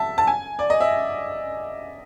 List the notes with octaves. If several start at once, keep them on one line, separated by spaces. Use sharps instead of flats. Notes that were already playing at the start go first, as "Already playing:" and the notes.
Already playing: E5 A5
A5
G#5
D5
D#5
E5